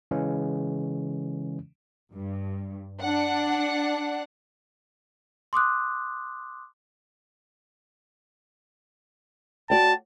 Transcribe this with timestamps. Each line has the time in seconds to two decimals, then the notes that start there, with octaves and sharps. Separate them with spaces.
0.11 C#3 E3 G#3 C#4
2.13 G2
3.01 D4 F#5
5.53 C6 D6 D#6 F#6
9.70 F#4 D5 G5 A5